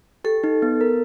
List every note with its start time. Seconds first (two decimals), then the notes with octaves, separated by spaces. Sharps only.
0.24 G4 A4
0.44 D#4
0.62 B3
0.81 A#4